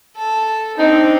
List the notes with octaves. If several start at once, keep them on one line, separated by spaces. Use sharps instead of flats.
A4
C4 D4 D#4